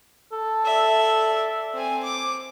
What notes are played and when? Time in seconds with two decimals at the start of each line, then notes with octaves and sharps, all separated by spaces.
0.33 A4
0.66 D5 E5
1.75 C4 G#5
2.04 D6